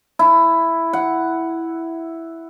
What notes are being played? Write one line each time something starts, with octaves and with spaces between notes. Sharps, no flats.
E4
F#5